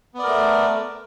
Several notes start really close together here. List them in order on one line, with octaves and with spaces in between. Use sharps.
B3 D5 A#4 A3